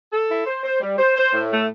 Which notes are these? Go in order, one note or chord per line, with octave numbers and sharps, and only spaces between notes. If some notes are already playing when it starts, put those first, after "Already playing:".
A4
E4
C5
C5
G3
C5
C5
A2
A3